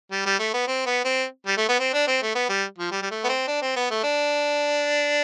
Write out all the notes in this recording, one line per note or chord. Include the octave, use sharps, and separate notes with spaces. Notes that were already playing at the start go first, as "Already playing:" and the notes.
G3
G3
A3
B3
C4
B3
C4
G3
A3
B3
C4
D4
C4
A3
B3
G3
F3
G3
G3
A3
B3
C4
D4
C4
B3
A3
D4